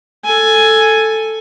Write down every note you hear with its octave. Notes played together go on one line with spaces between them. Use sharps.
A4 G#5